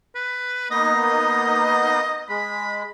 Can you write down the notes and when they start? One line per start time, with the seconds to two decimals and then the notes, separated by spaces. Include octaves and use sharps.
0.15 B4
0.71 A#3 B3 D#4 D#5
2.30 G#3 B5